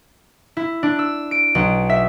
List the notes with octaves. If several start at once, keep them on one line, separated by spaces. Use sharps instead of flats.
E4
D4
E6
D7
B1
E5